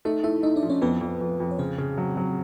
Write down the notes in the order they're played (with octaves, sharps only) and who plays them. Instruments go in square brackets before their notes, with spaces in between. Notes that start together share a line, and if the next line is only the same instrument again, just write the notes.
[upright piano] A3 [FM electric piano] D#4 D#5
[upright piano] A3 [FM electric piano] E4 E5
[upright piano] A3 [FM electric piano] D#4 D#5
[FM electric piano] D4 D5
[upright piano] F3
[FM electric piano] C#4 C#5
[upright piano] F2 [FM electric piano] B3 B4
[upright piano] F2
F2
F2
[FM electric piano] C#5
[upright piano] C#3 [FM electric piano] C4 C5
[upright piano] C#3
F#3
F#3